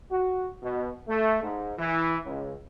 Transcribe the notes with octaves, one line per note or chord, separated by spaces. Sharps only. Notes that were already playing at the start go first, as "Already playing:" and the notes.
F#4
B2
A3
G#2
E3
C#2